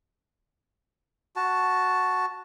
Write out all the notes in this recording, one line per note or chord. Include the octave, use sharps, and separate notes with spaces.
F#4 A5